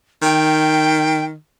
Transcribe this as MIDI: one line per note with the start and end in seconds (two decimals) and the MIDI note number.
0.22 1.35 51
0.22 1.24 79